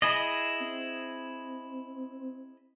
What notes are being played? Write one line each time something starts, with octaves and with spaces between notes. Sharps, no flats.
E4 G#4 D#5
C4